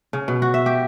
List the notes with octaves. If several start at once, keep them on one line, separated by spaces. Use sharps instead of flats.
C#3
B2
F#4
E5
G4